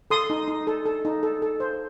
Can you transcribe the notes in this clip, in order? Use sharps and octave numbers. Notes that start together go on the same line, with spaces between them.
A4 C6 D#6
D#4
D#4
A4
A4
D#4
A4
A4
C5